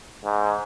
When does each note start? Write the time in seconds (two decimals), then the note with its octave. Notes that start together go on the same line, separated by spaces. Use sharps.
0.24 G#2